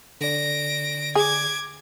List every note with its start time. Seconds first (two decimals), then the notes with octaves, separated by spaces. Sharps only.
0.21 D3 D5 A#6 D7
1.15 G#4 D6 G#6